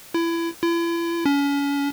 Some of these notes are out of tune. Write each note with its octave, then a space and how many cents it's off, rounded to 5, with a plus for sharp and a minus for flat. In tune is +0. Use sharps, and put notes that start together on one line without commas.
E4 +25
E4 +40
C#4 +35